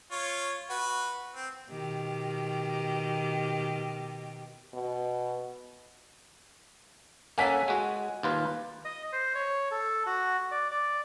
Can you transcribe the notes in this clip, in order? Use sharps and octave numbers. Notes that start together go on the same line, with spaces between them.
F4 C#5
F#4 B4
C4
B2 D#3 G4
B2
A#3 C#4 A4 F#5 G#5 B6
G#3 F#4
D#2 F4 B4
D#5
C5
C#5
A4
F#4
D5
D5